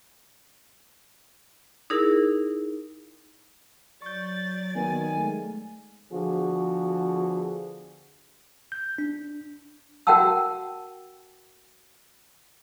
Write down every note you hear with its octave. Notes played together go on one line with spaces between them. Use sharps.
D#4 E4 G#4 A#4
F#3 D5 C#6 G6 A6
D#3 A#3 B3 F#4 G#5
G#3 A3
D3 F3 B3 F#4 G#4
G6
D4
F#4 A#4 F#5 G5 A5 E6